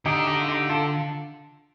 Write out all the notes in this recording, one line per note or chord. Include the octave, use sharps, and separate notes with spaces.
D3 D#4 G4
D#4 G4
F4
D#4 G4
F4 A4